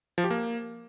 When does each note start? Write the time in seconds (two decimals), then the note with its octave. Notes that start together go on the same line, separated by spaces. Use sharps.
0.18 F3
0.24 G4
0.30 A#3